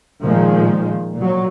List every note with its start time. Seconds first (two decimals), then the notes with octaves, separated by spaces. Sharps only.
0.23 A#2 D#3 F3 G#3
1.16 A#2 F#3